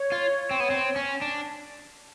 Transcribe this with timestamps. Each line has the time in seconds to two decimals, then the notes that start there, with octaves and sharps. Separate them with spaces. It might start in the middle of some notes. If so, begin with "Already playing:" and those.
Already playing: C#5
0.12 F4
0.51 C4
0.60 B3
0.70 C4
0.96 C#4
1.22 D4